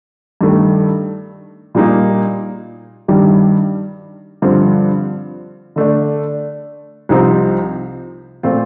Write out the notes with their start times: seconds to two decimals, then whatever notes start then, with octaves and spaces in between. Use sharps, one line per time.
0.41 G2 D#3 A3
1.75 A#2 G3 A#3 D#4
3.08 G2 D#3 G3
4.42 G2 D3 F3 C4
5.76 D3 A3 D4
7.09 C2 C3 F3 C4 D#4
8.43 A#2 A3 C4 F4